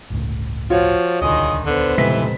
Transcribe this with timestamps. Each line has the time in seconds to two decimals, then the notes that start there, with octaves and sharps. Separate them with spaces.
0.10 G1 C#2 A2
0.70 F3 F4 F#4 C#5
1.22 D#1 C#2 D3 D#3 G#3 D#5
1.66 D3 B3 C5
1.98 F1 A#2 C#3 E3 G#3 B6